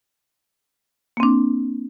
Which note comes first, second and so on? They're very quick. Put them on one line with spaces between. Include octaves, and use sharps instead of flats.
A#3 C4 D4